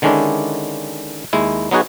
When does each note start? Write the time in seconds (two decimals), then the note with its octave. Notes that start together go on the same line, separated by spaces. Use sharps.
0.02 D3 D#3 G#3 C#4 D4 E4
1.33 D#2 G#3 E4
1.71 F#3 B3 D#4 F#4 G#4